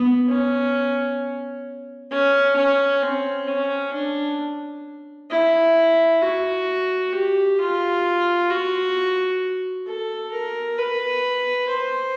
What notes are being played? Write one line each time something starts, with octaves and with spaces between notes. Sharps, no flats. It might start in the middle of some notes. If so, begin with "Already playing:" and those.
Already playing: B3
C#4
C#4
C#4
C4
C#4
D4
E4
F#4
G4
F4
F#4
A4
A#4
B4
C5